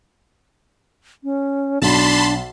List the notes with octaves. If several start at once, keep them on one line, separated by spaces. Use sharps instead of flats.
C#4
B1 D4 A5 B5 C6